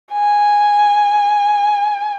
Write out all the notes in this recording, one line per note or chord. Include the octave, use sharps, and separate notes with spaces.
G#5